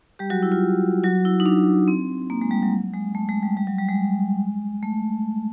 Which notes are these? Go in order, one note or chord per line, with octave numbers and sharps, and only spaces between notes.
G3 G4
F#3 F#4
E4
F4
F#3 F#4
E4
D#4
D4
C4
A#3
G#3
G3
F#3
G#3
A3
G#3
G3
G3
F#3
G3
G#3
A3